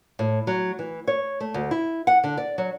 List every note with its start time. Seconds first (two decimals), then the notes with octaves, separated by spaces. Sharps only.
0.19 A2
0.47 F#3
0.79 E3
1.07 C#5
1.40 A3
1.54 D2
1.71 E4
2.07 F#5
2.24 D3
2.37 D5
2.58 F#3